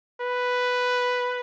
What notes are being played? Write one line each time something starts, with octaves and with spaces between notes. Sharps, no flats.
B4